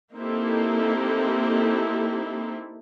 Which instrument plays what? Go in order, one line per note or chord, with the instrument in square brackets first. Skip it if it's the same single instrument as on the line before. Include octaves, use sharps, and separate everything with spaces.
[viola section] A#3 C4 D#4 E4 G4 A4